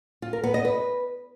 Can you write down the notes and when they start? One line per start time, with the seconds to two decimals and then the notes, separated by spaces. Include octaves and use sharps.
0.22 F4
0.33 A#4
0.44 B3
0.54 D#5
0.65 B4